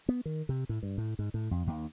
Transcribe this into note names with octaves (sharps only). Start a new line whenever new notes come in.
B3
D#3
C3
A2
G2
A2
G#2
A2
F2
D#2